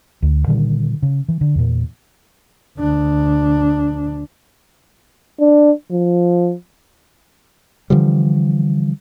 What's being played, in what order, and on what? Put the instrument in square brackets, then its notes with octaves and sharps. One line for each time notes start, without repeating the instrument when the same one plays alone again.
[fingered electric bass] D2
A#2 D3 D#3 G3
C#3
E3
D3
E2 A#2
[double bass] D2 D4
[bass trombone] D4
F3
[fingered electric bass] D3 E3 F3 G3